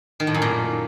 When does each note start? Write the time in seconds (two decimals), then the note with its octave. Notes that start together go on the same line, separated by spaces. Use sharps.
0.20 D#3
0.27 A2
0.34 F#2
0.42 A#2